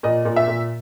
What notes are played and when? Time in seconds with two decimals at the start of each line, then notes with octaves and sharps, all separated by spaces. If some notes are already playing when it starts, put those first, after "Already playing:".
0.03 A#2 D#5
0.25 A#2
0.36 E5
0.47 A#2